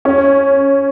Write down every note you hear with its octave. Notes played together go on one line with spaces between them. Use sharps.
C#4